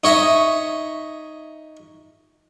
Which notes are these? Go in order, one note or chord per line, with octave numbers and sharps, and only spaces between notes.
D#4 C#5 D#5 E5